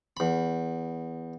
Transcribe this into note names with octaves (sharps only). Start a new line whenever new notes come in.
E2 B5